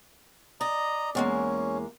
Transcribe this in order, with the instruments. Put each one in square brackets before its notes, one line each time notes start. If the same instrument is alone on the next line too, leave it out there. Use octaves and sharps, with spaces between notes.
[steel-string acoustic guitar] D5 [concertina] D#5 A#5
[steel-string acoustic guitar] E2 G#3 A#3 [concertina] C#4